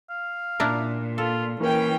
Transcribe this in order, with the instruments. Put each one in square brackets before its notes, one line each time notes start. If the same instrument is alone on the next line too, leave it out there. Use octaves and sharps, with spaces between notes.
[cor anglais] F5
[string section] A#2 [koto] D4 E4 A#4
[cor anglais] F4 [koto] A4
[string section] E3 G5 [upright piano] A#3 [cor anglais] C#4